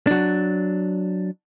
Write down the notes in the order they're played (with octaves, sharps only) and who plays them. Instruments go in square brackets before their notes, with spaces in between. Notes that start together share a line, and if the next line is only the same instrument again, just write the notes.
[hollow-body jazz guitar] F#3 D4